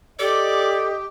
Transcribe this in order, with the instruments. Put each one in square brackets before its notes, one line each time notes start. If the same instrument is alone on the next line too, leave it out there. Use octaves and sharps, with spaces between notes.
[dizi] G4 [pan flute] A4 [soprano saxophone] D5 [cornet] D#5